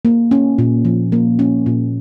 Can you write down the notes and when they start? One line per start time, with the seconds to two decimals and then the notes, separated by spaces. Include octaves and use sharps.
0.05 A#3
0.31 C#4
0.58 A#2
0.85 F3
1.12 A#3
1.39 C#4
1.66 A#2